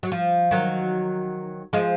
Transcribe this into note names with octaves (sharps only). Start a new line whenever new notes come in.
F#3
F3
D#3 F#3
F3 G#3